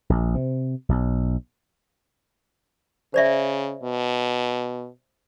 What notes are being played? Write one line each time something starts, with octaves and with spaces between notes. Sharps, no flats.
A#1
C3
B1
C#3 C5 D5 E5
B2